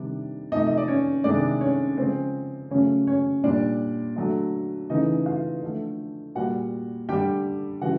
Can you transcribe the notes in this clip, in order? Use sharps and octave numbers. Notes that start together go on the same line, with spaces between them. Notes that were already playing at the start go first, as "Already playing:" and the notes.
Already playing: C3 D#3 G3 D4 D5
C3 F3 A3 D#4 D#5
D#5
D5
C#4 C#5
C3 D#3 G#3 D4 D5
C#4 C#5
C#3 F3 G#3 C4 C5
C#3 F#3 A3 C#4 C#5
C#4 C#5
A#2 G3 D4 D5
D3 F#3 A3
C#3 E3 A3 D#4 D#5
F4 F5
D3 F3 A3
A#2 G3 F#4 F#5
D3 G3 G4 G5
C#3 E3 G3 F#4 F#5